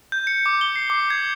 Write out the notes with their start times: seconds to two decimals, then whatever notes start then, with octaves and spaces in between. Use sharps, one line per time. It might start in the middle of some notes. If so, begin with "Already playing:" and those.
0.12 G6
0.27 C#7
0.46 D6
0.61 G7
0.76 C7
0.90 D6
1.10 G#6